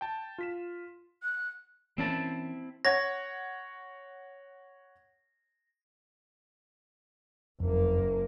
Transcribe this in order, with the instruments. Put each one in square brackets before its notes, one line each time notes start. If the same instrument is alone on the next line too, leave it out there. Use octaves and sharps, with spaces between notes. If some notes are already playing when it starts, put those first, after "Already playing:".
[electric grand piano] G5 A5
F4 B6 E7
[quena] F#6
[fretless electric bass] E3 A#3 C#4 [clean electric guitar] C4 E4 A5
[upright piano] C#5 F#5 G#6 [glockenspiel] A#6
[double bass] F#1 A#3 [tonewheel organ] F2